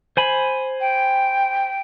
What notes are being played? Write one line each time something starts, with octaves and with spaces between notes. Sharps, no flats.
C5 G#5 B5
G5